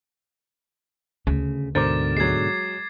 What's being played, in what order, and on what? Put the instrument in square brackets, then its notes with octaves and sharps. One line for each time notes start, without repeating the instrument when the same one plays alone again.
[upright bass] D2 [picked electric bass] C#3
[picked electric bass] G#2 B2 D3 [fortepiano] A#4 C5 [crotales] D6 A6
[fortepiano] F#3 G#3 [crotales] G#6 C7